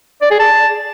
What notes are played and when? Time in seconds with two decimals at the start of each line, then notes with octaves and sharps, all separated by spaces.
0.22 D5
0.31 G#4
0.39 A5